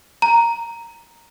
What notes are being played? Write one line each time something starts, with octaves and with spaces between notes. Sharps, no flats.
A#5